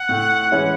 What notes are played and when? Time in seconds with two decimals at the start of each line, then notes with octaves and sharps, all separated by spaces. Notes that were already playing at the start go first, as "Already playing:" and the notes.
Already playing: F#5
0.09 A2
0.51 E3 G#3 C#4 E4